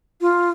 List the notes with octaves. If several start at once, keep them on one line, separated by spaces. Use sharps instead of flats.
F4